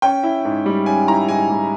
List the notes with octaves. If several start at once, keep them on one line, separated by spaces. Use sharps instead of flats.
C#4 G5
E4
G#2
G3
C#4 G#5
E4 A#5
G#2 G#5
G3